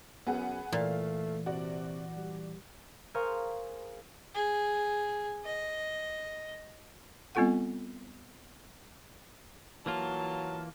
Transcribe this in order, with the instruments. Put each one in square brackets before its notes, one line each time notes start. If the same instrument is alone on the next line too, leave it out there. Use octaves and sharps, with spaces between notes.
[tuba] F#2 [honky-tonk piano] B3 G#4 F#5
[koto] A#2 [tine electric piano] E3 [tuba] A3 [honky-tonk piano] F5
[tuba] C3 [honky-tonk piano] F#4 D5
[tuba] G3
[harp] G#4 A#4 C5 F5 C#6
[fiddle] G#4
D#5
[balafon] G3 B3 C4 F4 A4 F#5
[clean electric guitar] E3 A#3 F4 [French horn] F#3 [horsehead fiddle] A5